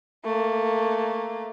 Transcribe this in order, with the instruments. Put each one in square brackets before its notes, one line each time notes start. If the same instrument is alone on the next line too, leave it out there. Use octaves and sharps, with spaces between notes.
[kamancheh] A3 A#3